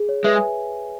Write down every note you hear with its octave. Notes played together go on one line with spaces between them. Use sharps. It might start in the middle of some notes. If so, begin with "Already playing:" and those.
Already playing: G#4
C#5
G#3 B4 E5
E5 G#5